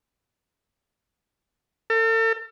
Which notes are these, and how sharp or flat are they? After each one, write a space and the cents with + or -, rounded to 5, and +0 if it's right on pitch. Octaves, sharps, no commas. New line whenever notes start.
A4 +40